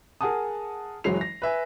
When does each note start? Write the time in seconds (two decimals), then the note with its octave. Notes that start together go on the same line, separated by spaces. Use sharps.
0.21 G#4 A#4 F#5 G#5 A5 D#6
1.04 F#1 E3 F#3 G#3 C7 F7
1.21 A#6
1.42 B4 E5 G#5